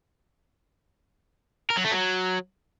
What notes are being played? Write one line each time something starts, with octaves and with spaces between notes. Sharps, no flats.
A#4
F#3
A3
F#3